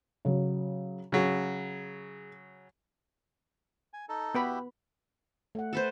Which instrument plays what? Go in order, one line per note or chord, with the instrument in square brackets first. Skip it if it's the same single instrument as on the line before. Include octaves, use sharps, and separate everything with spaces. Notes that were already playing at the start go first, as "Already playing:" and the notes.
[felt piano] C#3 F#3
[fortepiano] C#3 F#3 [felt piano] G#4
[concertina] G#5
D#4 A4
[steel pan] B3 B4 B5 [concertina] E4 F#4 G4
[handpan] A3 F#5
[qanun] A4 B4 C5